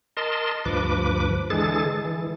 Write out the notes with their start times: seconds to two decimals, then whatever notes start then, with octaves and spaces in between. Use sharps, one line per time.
0.17 A#4 D#5 A5 C6
0.65 D2 G2 F3 B4 D6
1.50 D3 E3 G#3 G#4 A4 A6
2.05 E3